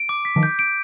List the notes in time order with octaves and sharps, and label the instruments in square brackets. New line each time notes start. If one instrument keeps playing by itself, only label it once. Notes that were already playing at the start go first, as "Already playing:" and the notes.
Already playing: [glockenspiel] D7
D6
B6
[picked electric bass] D#3 F3
[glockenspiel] G6
D7